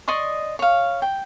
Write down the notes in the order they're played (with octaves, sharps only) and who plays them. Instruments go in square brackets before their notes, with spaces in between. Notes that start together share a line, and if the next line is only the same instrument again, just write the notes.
[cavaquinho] D5 D#5 C6 C#6
C#5 F5
G5